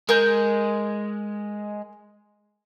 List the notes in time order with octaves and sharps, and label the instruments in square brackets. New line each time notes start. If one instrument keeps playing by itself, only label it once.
[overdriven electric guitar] G#3 [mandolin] A#4 G6